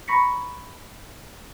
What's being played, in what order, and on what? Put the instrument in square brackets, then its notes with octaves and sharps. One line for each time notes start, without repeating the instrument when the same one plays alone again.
[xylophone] A#5 B5 C#6 A#6 B6 C#7